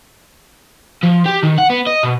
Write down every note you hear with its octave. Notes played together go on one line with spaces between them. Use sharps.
F3
G4
D#3
F#5
B3
D#5
B2